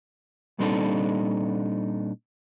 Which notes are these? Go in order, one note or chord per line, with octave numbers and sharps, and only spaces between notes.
A#2 G3 C4 D4 D#4 A4